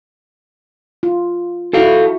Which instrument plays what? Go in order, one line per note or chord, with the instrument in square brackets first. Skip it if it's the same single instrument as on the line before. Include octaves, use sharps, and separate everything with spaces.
[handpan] F4
[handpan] E4 F#4 [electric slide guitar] A4 F5